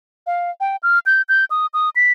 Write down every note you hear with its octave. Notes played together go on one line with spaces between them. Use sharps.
F5
G5
F6
G6
G6
D#6
D#6
B6